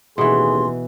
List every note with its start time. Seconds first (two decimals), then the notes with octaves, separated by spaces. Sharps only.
0.18 A1 D#2 B2 E3 G#4 C6